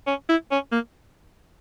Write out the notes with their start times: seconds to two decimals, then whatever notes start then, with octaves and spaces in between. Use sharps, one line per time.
0.07 C#4
0.29 E4
0.52 C#4
0.72 A#3